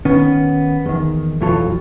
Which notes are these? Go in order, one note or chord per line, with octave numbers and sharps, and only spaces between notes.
D#3 B3 C#4
E2 D#3
B1 F2 E3 F#3 F4 A4